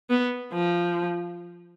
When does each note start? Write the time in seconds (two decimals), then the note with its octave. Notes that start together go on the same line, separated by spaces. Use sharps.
0.10 B3
0.53 F3